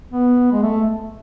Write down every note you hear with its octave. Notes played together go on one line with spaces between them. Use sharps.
B3
G#3
A3